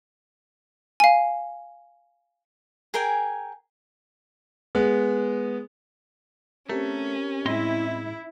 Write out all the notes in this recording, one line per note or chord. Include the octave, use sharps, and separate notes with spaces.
F5 G#5
G#4 A#4 G5 G#5
G#3 B3
A3 C4 C#4 G4 A#4
A2 G#3 C4 E4 D#5 C6